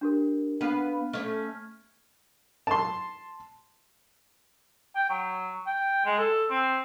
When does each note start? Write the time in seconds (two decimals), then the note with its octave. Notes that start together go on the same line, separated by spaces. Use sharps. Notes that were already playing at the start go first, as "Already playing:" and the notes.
0.01 D4 G4 A#4
0.61 B3 D4 F5 F6
1.13 A3 C#4 F6 G#6
2.67 A5 C6
4.95 G5
5.09 F#3
5.66 G5
6.05 G#3
6.18 A4
6.50 C4